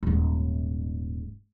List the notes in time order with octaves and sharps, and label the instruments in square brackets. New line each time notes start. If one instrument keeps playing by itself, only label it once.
[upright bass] D#1 G#2